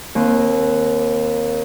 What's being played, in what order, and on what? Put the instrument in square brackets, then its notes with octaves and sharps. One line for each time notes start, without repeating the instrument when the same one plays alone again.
[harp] D#2 C4